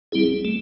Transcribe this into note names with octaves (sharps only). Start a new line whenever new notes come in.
G3 C4 E4 G#4
A3